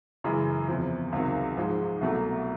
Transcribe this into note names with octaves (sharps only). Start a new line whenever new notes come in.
F#2 C#3 E3 G#3
E2 C3 F3
C#2 C3 D#3 F#3
G#2 F3 G#3
C2 B2 F#3 A3